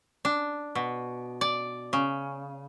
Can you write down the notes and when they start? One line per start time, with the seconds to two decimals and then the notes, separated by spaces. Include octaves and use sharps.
0.25 D4
0.75 B2
1.41 D5
1.93 C#3